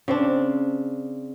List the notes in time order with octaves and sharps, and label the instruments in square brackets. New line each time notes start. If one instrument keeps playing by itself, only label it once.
[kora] C#3 C4 D4